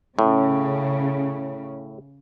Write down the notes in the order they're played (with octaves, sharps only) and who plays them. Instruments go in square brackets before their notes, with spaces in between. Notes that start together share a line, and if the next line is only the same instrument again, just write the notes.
[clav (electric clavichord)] A2 [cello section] C#3